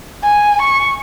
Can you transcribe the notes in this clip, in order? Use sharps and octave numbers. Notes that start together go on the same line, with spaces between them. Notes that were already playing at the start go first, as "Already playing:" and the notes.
G#5
C#6